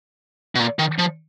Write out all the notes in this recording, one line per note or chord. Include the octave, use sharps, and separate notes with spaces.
B2
A#2
D#3
F3